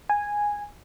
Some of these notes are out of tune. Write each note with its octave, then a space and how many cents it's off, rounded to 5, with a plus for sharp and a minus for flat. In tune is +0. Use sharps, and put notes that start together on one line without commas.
G#5 -10